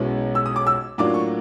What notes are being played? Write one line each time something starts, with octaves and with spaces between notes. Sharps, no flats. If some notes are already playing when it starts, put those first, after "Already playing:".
Already playing: B1 B2 G#3 C#4 E4
E6
D#6
D6
E6
A2 F#3 A#3 D4 F4 D6
C#6